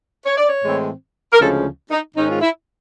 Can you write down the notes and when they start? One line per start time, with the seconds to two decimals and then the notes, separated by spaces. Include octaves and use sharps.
0.26 C#5
0.38 D5
0.49 C#5
0.64 A2 E3 G#3 C4
1.33 A#4
1.40 D2 C#3 F3 G#3 C#4 A4
1.91 D#4
2.16 G#2 D#3 G#3 C#4 D#4
2.30 F4
2.42 E4